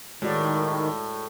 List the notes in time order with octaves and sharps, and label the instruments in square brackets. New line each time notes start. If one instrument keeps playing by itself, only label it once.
[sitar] A2 [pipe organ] D#3 [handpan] G#3 F#4 D5